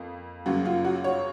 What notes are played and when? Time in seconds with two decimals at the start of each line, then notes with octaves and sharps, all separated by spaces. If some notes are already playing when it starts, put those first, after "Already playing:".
Already playing: F2 A#3
0.46 F#2 C#3 F#3 A#3 F#4
0.65 F4
0.85 F#4
1.04 C#5